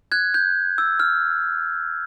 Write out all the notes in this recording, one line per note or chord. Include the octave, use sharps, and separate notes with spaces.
F#6 G#6
G6
E6
F6